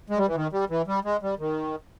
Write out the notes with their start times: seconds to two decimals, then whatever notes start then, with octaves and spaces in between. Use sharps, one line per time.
0.10 G#3
0.18 G3
0.27 E3
0.35 D#3
0.53 G3
0.70 E3
0.87 G3
1.05 G#3
1.22 G3
1.39 D#3